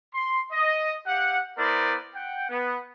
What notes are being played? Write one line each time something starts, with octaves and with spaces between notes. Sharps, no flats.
C6
D#5
G4 F5 F#5
B3 E4 A#4 C5 D5
F#5 G5
B3